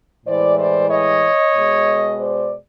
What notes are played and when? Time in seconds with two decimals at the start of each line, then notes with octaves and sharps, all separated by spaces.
0.25 A2 E3 G#3 C5 D5
0.57 C5 D5
0.89 C#5 D#5
1.54 B2 G#3
2.18 C5 D5